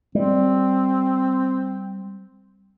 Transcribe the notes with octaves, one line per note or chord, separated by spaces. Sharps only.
G3 C4